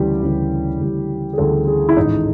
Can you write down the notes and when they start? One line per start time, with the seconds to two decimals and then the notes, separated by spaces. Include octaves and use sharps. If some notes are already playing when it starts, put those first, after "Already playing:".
Already playing: D2 C#3 E3 G3 G4
0.21 D2 C#3 E3 G3
0.80 D2 C#3 E3 G3
1.33 G#4
1.38 D2 C#3 E3 G3 A4
1.67 G#4
1.89 E4
1.97 A1 G#2 D#3 D#4